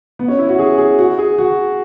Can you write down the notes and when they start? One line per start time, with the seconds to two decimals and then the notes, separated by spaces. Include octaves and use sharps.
0.19 B3
0.28 C#4
0.39 E4
0.49 F#4
0.59 G#4
0.78 G#4
0.99 F#4
1.18 G#4
1.38 F#4